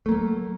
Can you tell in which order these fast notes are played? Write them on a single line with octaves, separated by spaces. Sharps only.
A3 A#3 F#3